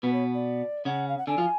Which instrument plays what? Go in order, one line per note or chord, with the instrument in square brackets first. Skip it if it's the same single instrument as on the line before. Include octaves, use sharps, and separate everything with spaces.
[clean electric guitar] B2 B3 [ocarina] B4
[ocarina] C#5
D5
[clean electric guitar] C#3 C#4 [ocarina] F#5
[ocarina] F5
F#5
[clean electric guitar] D3 D4 [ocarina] G#5
[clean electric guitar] F3 F4